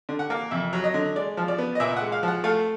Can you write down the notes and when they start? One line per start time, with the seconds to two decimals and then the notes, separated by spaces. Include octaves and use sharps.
0.09 D3
0.19 F#5
0.30 A#3
0.51 F2 E5
0.73 F#3
0.84 D#5
0.94 D3
1.16 G#3 D5
1.37 F3
1.48 D5
1.58 B3
1.75 D#5
1.80 A#2 E5
1.96 G#3 F#5
2.12 F5
2.23 F3 F#5
2.44 A3 F5